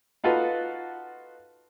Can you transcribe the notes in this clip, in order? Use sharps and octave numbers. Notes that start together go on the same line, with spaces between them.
D#4 F4 F#4 A4 B4